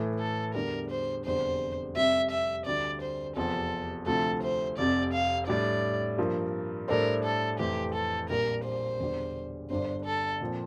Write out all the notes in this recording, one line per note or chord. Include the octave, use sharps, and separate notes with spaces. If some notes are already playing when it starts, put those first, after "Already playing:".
Already playing: A2 E3 A3
A4
E2 D3 G3 A#4
C5
F1 E2 D3 G3 C5
F1 F2 C3 G3 E5
E5
D2 D3 G3 D5
C5
F1 E2 C3 F3 C4 A4
D2 C3 F3 A3 A4
C5
F1 F2 C3 D5
F5
A2 G3 D4 D5
G2 F3 A#3
A2 G3 D4 A4 A#4 C5
A4
F1 F2 E3 A3 C4 G4
A4
A#1 A#2 G3 A#3 A#4
C5
E1 E2 D3 G3
G1 G2 D3 G3 D4 C5
A4
A#2 F3 C4